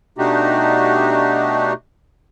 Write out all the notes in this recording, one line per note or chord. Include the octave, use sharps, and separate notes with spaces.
B2 A3 D4 D#4 F#4 G4